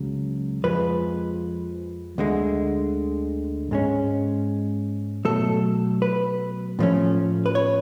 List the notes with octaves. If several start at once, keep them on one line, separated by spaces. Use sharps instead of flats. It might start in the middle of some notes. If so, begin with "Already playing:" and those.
Already playing: C#2 C#3 F#3
F2 F3 G#3 B4
D2 D3 G#3
G#2 G#3 C#4
B2 F#3 A3 A4
B4
A2 F3 A3 C#4
B4
C#5